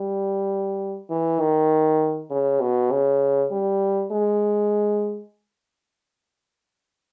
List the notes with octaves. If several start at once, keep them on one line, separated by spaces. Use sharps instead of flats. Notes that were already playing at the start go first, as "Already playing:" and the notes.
Already playing: G3
E3
D#3
C#3
B2
C#3
G3
G#3